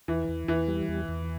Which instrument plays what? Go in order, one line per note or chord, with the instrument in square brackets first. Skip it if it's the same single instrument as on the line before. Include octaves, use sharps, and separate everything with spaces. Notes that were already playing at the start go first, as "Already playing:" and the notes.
[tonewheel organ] E2 [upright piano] E3
[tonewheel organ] E2
[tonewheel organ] E2 [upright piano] E3
[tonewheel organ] G3
E2
E2